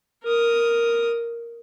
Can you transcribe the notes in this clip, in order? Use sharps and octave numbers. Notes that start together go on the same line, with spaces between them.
A#4 D#6